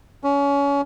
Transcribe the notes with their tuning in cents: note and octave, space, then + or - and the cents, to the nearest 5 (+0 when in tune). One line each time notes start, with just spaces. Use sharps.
C#4 +25